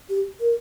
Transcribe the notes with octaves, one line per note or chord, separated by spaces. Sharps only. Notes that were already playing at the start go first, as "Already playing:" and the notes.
G4
A#4